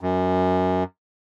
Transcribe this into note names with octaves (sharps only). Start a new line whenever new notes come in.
F#2